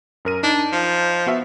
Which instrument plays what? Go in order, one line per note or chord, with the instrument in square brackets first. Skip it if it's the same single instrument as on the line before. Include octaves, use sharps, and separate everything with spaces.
[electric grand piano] F#2 A#4 D#7
[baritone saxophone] D4 [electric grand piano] D#4
[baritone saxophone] F3
[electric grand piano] B3 F#4 E5